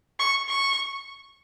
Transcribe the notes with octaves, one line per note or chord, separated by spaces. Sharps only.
C#6
C#6